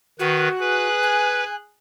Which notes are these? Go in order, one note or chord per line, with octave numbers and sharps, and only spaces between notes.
D#3 F#4 B4
G#4 B4 F#6
G#5